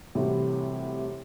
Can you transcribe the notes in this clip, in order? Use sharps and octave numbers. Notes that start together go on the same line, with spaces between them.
C2 A2 C3 E3 F#4